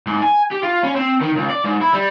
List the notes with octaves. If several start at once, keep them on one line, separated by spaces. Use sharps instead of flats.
G#2
G#5
G4
F4
C#4
C4
D#3
C#2
D5
G#2
E4
G3